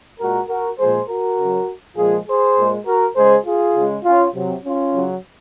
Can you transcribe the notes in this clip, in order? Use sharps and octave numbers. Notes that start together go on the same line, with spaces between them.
A#2 G#3 F#4 A#4
F#4 A#4
A#2 F3 G#3 G#4 C5
F#4 A#4
C#3 F#3
A#2 F3 G#3 F4 G#4
G#4 C5
A#2 G#3
F#4 A#4
C#3 G#3 G#4 C5
F4 G#4
C#3 G#3
C#4 F4
C3 F#3
C#4 F4
C#3 F#3